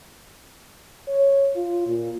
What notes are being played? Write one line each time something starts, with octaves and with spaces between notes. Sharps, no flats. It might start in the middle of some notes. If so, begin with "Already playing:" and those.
C#5
F4
A#2